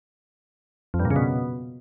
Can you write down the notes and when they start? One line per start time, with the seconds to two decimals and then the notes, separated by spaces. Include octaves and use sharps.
0.94 F2
0.99 G2
1.05 A#2
1.10 C#3
1.16 B2